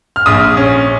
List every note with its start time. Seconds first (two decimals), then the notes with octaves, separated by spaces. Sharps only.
0.16 F6
0.26 A#1 D#6
0.57 C#4